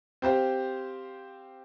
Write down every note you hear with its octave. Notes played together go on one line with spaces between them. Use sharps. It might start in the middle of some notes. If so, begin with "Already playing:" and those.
C4 G4 C5 F5